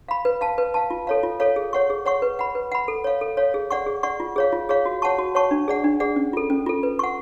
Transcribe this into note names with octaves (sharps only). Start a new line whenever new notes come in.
F5 B5
B4
F5 A5
B4
F5 A5
F4
A4 C#5 F5
F4
A4 C#5 F5
G#4
C#5 F#5 C#6
G#4
C#5 F#5 C#6
B4
F#5 B5
B4
F#5 B5
A4
C#5 F5
A4
C#5 F5
G#4
D5 F#5 C#6
G#4
D5 F#5 C#6
F4
G#4 C#5 F5
F4
G#4 C#5 F5
F#4
C#5 F#5 A5 C#6
F#4
C#5 F#5 A5 C#6
D4
G#4 D5 F#5
D4
G#4 D5 F#5
C#4
F4 A4
C#4
F4 A4
B4
F#5 C#6